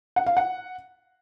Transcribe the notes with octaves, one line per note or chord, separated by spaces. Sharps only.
F#5
F5
F#5